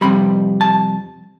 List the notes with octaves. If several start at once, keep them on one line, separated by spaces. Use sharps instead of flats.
F2 C3 G3 B5
A5